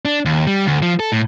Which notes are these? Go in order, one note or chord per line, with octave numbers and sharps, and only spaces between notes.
D4
D#2
G3
D2
F3
A4
A2